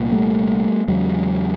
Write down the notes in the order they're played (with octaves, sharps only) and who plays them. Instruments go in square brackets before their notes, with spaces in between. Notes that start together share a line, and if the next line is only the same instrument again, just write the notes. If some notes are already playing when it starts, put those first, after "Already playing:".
Already playing: [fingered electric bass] C2 A#2
G3 A3
E2 C#3 F#3 G#3